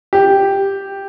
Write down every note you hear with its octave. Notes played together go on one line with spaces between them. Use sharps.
G4